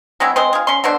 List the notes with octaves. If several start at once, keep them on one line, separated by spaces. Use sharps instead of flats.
F#3 G#3 C4 E4
G#3 C4 C5
F4 G#4
C#4 C6
B2 D3 D4 C5